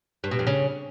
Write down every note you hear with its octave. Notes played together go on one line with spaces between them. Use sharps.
G2
B2
F2
C#3